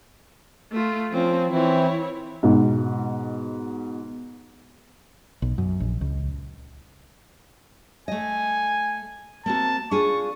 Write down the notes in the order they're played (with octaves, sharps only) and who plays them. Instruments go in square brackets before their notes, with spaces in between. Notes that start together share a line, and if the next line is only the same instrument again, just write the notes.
[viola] A3 F4
[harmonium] F3 [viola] C4 C#4
[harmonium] E3 C4 [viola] E4 C#5
[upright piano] G#2 B2
[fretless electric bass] B1
F#2
A#1
C#2
[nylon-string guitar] A3 D#5 [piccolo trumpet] G#5
[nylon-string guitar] A#3 C4 F#4 [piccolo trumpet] A5
[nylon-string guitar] D4 F4 G#4 [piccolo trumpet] C#6